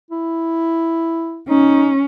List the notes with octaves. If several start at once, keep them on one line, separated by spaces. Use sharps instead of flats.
E4
C#4 D#4